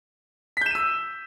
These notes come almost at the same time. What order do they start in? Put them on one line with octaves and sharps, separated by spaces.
B6 G6 E7 D#7 E6